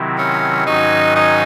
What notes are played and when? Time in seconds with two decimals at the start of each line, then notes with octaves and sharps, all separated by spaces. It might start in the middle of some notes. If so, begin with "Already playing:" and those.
Already playing: C3 D#3 F#3 C4 E4
0.18 C#4
0.67 G#2 D#3 F#3 C#4 D#4 F#4
1.16 D#4